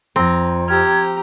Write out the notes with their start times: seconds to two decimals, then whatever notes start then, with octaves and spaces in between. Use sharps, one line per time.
0.16 F2 C4 A#5
0.68 G4 A#5 E6 F6 G#6